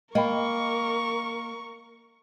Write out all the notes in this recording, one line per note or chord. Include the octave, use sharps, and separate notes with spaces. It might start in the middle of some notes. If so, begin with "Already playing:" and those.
A#3 A#4 D#5 G5 B5 C#6